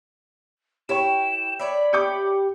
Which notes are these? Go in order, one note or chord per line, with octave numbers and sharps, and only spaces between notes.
E4 G4 C#5 G5 C#6 E7
C#5 D5 E5 B5
G4 D6 G6 C#7